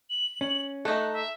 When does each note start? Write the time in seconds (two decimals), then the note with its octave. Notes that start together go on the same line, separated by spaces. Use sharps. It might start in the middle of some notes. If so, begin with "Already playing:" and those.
0.10 F#7
0.41 C#4
0.85 A3 D#4 A4 F#6
1.13 E5